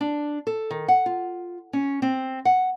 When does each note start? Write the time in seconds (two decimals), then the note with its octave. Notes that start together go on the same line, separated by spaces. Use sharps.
0.01 D4
0.47 A4
0.71 D#3
0.88 F#5
1.06 F4
1.73 C#4
2.02 C4
2.45 F#5